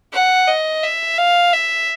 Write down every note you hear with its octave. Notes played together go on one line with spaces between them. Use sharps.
F#5
D#5
E5
F5
E5